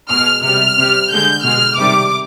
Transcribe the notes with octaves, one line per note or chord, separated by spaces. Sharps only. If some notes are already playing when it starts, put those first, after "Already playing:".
B2 G#3 F6
C3 G3 F6
C3 G3
D3 G#3 G6
B2 G#3 F6
C3 D#3 G3 D6